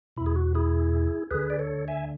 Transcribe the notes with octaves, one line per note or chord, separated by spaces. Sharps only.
E2 B2 E4
G#4
F#4
E4 G#4
D2 D3 G#4 B4
D5
A4 C#5
E5 G#5